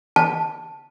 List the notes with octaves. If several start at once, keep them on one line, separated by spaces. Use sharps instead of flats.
A5